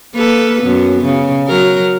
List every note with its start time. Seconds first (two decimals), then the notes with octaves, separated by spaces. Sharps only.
0.15 A#3 A4 B4
0.62 F#2 B3
1.05 C#3
1.48 F#3 A#4